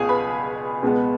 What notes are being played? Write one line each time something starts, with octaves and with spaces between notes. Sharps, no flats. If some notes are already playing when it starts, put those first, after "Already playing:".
Already playing: C#2 B2 G#4 F5 G#5 D#6
B4 B5
C#2 B2 G#3 B3